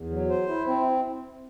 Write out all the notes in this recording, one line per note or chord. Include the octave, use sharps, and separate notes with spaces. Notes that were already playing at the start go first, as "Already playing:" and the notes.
Already playing: E2
F#3
C5
E4
C4